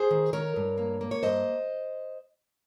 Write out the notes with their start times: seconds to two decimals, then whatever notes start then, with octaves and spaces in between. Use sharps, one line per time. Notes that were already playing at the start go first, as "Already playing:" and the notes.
Already playing: G#4 C5
0.11 D#3
0.33 D#3 A#4 C#5
0.56 G2
0.78 A#3
1.01 A#3
1.11 C#5
1.23 G2 C5 D#5